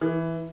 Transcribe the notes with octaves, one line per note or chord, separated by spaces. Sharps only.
E3